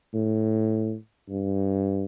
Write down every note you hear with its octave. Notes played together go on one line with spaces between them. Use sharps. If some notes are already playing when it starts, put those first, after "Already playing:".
A2
G2